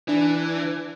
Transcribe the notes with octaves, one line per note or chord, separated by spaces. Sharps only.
E3 D4